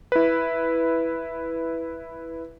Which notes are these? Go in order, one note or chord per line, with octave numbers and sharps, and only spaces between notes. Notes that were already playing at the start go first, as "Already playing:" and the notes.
E4 B4